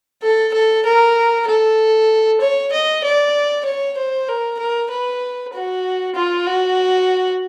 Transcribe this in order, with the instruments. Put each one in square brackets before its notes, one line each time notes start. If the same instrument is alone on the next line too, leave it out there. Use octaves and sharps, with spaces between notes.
[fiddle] A4
A4
A#4
A4
C#5
D#5
D5
C#5
C5
A#4
A#4
B4
F#4
F4
F#4